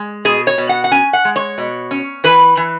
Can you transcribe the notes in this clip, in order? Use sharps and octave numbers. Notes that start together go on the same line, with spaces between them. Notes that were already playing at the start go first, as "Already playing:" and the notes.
Already playing: G#3
B2 G#4
C#5
B2
F#5
F#5
C#4 G#5
F#5
G#3
C#5
B2
C#4
E3 B4
E3